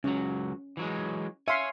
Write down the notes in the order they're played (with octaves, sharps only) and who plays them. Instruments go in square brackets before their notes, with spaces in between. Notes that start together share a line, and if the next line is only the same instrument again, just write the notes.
[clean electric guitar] C#2 F#3 [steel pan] C#4
[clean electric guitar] E3 F#3 G#3
[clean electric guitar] C#5 G#5 [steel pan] E5 F5 C6